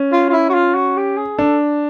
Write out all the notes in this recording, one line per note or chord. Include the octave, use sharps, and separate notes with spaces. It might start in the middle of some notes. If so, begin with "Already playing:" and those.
Already playing: C#4
F4
F4
E4
F#4
F4
F#4
G4
G#4
D4 A4